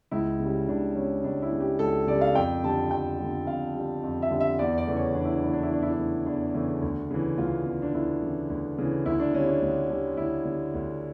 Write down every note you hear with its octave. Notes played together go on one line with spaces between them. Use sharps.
C#2 E4
C#3
G3
C#2 D4
C#3 G3 C#4
C#2 D4
E4
C#3 G3
G4
C#2 A4
C#3 G3 D5
F5
F2 G5
D3 G3 A5
F2 G5
D3 G3
F2 F5
D3 G3
F2
E5
D3 G3
E5
E2 D5
D5
C#3 E3 A3
C#5
E2 D4
E4
D4
C#3 E3 A3 E4
D4
E4
E2 D4
E4
D4
C#3 E3 A3
E2 D4
C#3 E3 A3
D2
C#3 E3
D2 F4
C#3 E3
D4
D2 E4
C#3 E3
D2
C#3 E3
D2 E4
D4
D3 G3 C#4
D4
D2
D3 G3
D2 E4
D3 G3
D2